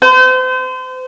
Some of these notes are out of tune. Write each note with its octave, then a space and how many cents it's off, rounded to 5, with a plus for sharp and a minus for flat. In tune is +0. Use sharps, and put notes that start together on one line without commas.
C5 -35